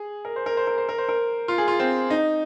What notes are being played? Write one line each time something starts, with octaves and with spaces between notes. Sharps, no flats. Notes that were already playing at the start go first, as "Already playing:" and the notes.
Already playing: G#4
A#4
C5
A#4
C5
A#4
C5
A#4
C5
A#4
F4
G#4
F4
C4
D#4